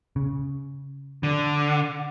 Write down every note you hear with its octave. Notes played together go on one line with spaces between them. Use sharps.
C#3
D3